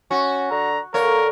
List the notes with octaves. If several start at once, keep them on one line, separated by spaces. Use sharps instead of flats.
C#4 F#4
D3 A#5
D3 A#3 A#4 C#5